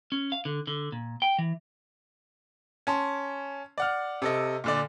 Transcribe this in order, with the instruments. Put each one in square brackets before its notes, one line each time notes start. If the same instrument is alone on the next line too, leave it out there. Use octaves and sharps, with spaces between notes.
[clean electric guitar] C#4
F5
D3
D3
A#2
G5
E3
[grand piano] C#4 A5 C6
D5 F#5 F6
C3 A4 D#5
A#2 D3 D5